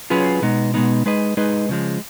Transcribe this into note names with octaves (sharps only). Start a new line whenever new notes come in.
F#3 C#4 F4 G#4 B4
B2 G#3 B3 D#4
B2 G#3 B3 D#4
G#3 D#4 G#4 B4 D#5
G#3 D#4 G#4 B4 D#5
C#3 F3 G#3